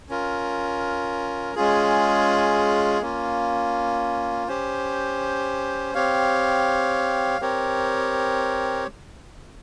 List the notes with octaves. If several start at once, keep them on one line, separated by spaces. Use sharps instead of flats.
C#4 F4 A#4
G#3 C#4 F4 G#4
A#3 C#4 F4
C#4 G4 C5
C4 G4 C#5 F5
C4 G4 A#4 C#5